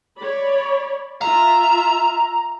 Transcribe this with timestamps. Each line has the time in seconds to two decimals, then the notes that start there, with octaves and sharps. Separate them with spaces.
0.19 C#5 D5 B5
1.22 F4 E5 A#5